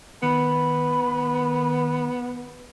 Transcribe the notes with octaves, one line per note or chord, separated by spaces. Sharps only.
D#3 B3 B5